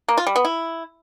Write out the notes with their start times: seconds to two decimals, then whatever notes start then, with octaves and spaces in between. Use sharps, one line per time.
0.08 A#3
0.18 F4
0.27 G3
0.36 B3
0.45 E4